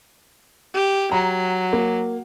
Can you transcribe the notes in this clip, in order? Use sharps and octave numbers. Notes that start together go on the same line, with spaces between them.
G4
F#3 A#5
A#3